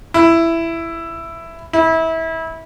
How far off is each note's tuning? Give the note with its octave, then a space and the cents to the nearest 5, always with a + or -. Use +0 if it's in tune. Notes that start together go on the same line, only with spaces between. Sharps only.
E4 +10
E4 -25